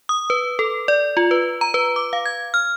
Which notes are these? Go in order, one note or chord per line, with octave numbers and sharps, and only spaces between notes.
D#6
B4
A4
D5
F4
B4
A#5
B4
D6
F5
G#6
F6